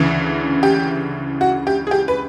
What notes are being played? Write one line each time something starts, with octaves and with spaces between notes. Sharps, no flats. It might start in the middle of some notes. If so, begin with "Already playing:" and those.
Already playing: D2 C#3 E3
G4
F#4
G4
G#4
G4
B4